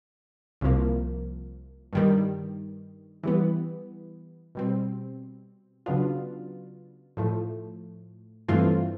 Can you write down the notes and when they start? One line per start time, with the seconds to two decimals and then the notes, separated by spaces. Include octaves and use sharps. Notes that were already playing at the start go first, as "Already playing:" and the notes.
0.61 C2 C3 F3 A#3
1.93 G2 D#3 G3
3.23 E3 G3 B3
4.55 B2 G3 C4
5.86 C#3 F#3 B3 D4 F4
7.17 A2 F3 A3
8.48 G2 E3 A3 C4 F4